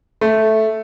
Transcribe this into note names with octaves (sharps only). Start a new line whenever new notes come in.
A3